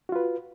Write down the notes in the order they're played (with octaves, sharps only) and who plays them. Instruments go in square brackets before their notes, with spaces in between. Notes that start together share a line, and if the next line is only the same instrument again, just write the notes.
[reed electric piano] F#4
F4
B4